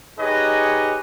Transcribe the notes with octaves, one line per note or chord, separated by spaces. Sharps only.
D#4 G4 G#4 B4 C#5 D#5